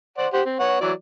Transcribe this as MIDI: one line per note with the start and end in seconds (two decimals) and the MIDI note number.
0.18 0.27 72
0.18 0.27 74
0.18 0.27 78
0.33 0.41 67
0.33 0.41 72
0.33 0.41 78
0.45 0.59 60
0.59 0.78 59
0.59 0.78 73
0.59 0.78 78
0.81 0.92 52
0.81 0.92 54
0.81 0.92 74